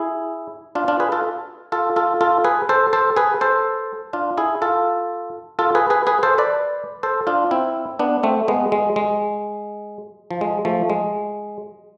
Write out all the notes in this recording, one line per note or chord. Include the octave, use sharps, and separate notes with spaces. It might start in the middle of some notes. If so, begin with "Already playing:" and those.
Already playing: E4 G#4
D4 F4
D4 F4
G#4 B4
F4 A4
F4 A4
F4 A4
F4 A4
G#4 B4
A4 C5
A4 C5
G#4 B4
A4 C5
D4 F4
E4 G#4
F4 A4
F4 A4
G#4 B4
G#4 B4
G#4 B4
A4 C5
B4 D5
A4 C5
D4 F4
C4 E4
B3 D4
A3 C4
G#3 B3
G#3
G#3
F3
G#3
F3 A3
G#3